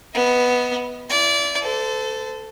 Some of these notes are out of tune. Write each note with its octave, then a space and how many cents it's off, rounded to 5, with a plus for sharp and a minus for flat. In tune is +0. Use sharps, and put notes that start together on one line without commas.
B3 +0 D#5 +45
E4 +20 D5 -25
A4 +0 C5 -35